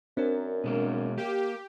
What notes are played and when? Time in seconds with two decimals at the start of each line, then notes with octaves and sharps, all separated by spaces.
0.17 F#2 C4 D4 A#4
0.64 B2 G#3 A#3
1.17 A#3 G4